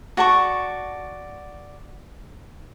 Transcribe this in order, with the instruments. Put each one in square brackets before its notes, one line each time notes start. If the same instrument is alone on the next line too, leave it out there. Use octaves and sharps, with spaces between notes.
[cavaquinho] F#4 D5 A5 C#6